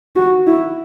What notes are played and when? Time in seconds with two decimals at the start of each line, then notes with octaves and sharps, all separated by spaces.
0.16 F#4
0.47 E4